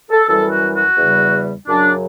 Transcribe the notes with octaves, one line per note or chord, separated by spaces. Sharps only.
A4
F#2 E3 G3 A4
F#4
F#4
E2 C#3 G3
F#2 C#3 F#3 D4